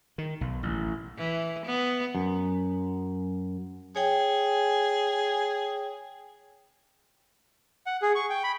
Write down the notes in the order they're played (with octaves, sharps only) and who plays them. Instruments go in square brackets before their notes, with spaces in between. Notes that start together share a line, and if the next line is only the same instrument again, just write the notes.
[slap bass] D#3
B1
A1
[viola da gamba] E3
B3
[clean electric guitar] F#2
[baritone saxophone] G#4 [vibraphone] C#5 G5
[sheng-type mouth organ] F#5
G#4
C#6
G5
B5